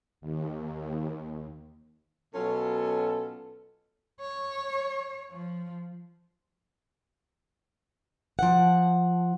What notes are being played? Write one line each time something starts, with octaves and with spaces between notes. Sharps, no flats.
D#2
B2 F#3 C#4 F4 A4
C#5
F3
F3 F#5